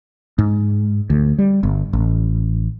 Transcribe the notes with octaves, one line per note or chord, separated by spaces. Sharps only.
G#2
D2
G3
G1
A1